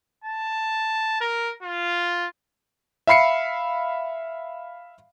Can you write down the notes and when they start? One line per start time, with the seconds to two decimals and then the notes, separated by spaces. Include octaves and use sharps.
0.24 A5
1.21 A#4
1.63 F4
3.07 E5 F5 B5 C7 C#7